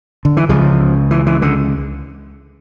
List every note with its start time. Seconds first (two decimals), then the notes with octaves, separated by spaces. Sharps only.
0.25 D3
0.37 E3
0.49 C#2 C#3 F3
1.11 E3
1.26 E3
1.42 D3